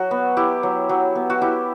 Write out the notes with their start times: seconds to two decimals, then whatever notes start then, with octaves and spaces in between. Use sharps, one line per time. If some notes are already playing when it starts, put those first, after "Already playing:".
Already playing: F#3 F#4
0.11 B3
0.37 E4 G4
0.63 F#3
0.89 F#3
1.15 B3
1.30 F#4
1.42 E4 G4